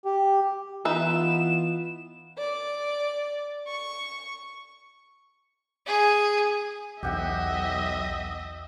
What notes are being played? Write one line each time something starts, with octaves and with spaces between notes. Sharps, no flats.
G4
E3 B3 D#4 F4 B4 E5 E7
D5
C#6
G#4
B1 E2 G4 D#5 E5 F#5 G5